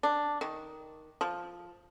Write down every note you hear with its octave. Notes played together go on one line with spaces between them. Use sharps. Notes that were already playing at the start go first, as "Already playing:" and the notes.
D4
D#3
F3